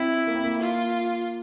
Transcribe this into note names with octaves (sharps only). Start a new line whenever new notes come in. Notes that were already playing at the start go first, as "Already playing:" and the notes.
Already playing: C4 E4
A#3
C4
A#3
F4